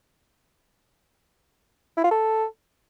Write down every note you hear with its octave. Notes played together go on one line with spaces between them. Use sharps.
E4
F4
A4